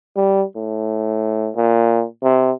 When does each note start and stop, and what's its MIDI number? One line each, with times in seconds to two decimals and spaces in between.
0.16 0.43 55
0.56 1.50 45
1.56 2.04 46
2.23 2.52 48